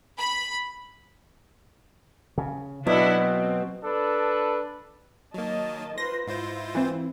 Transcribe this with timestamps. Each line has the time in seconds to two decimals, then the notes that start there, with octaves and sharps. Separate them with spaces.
0.18 B5
2.38 C#3
2.87 B2 F#3 D4 E4 F#4
3.20 C4
3.84 D4 A4 B4
5.34 D#3 F#3 A#3 D#5 A5
5.98 F4 B4 C5 C6 A#6
6.27 G#2 E4 F4 C5
6.75 E3 C4